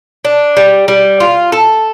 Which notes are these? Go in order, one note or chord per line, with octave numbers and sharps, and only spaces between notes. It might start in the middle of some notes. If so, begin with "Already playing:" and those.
D4
G3
G3
F4
A4